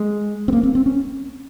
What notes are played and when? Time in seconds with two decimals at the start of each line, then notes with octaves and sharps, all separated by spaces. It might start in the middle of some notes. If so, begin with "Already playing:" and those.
Already playing: G#3
0.48 C4
0.53 A#3
0.63 C4
0.75 C4
0.86 C#4